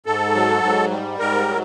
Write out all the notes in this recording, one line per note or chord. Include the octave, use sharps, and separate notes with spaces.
G#2 A4
F#3
G#2
G3
G#2 A#4
F#3